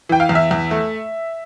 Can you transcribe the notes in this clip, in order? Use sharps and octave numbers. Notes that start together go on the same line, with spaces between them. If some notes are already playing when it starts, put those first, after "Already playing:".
E3 G5
F5
E2
E5
E2
A3